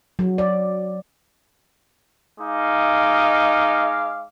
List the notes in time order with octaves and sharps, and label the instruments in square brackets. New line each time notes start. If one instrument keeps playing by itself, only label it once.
[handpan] F#3
D5
[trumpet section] G#3 D#4 F5 D6